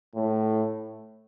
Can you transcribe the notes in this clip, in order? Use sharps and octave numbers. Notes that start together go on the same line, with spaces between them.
A2